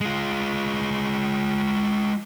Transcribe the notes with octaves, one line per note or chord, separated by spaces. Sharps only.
G#3 F4